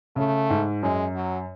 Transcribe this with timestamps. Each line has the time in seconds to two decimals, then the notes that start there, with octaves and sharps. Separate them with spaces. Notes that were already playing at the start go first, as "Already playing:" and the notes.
0.16 C#3 A3
0.50 G#2
0.82 F#2 G#3
1.15 F#3